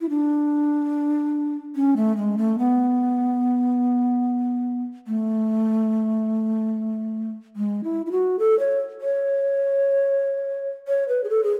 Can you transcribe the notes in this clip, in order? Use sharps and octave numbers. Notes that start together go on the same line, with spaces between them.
E4
D4
C#4
A3
G#3
A3
B3
A3
G#3
E4
E4
F#4
A4
C#5
C#5
C#5
B4
G#4
A4
G#4